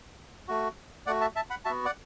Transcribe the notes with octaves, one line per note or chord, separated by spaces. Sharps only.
A3 F#4
A3 F#4 D5 F#5
E5 A5
E5 A5
F#5 B5
B3 F#4 E5 A5
D5 F#5